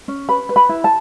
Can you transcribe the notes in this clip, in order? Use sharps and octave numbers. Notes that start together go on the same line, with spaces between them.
C#4
B4 B5
B4
B5
E4
A5